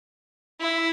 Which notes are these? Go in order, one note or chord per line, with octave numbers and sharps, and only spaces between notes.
E4